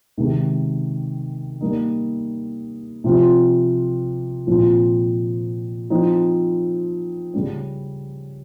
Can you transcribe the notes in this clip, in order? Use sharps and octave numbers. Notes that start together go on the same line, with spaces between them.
C3 D#3 G#3
G3 A#3 D#4
C3 F3 C4 F4
A#2 F3 C4 F4
F3 C4 D#4
C#3 G3 C#4